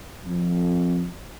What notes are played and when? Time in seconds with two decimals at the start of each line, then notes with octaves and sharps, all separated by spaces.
0.25 F2